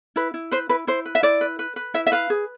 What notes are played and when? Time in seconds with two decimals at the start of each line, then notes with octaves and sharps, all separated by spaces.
0.16 E4 B4
0.34 E4
0.51 B4 C5
0.69 E4 B4
0.87 E4 C5
1.06 B4
1.15 E5
1.23 E4 D5
1.41 B4
1.59 B4
1.76 B4
1.94 E4 E5
2.07 E5
2.12 B4 F5
2.30 G#4